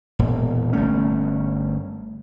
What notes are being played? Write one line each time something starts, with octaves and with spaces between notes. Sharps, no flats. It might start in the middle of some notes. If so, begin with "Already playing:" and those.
E1 A#2
G1 A3 C#4